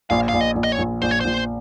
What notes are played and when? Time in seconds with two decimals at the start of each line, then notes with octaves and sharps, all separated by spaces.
0.10 A#1 F5
0.29 A#1 F5
0.41 D#5
0.56 A#1
0.64 D#5
0.72 C#5
0.79 A#1
1.02 A#1 C5
1.11 C#5
1.20 A#1 C5